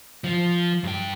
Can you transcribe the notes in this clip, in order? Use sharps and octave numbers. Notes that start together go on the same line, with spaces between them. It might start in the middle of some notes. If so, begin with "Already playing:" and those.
F3
G2 G5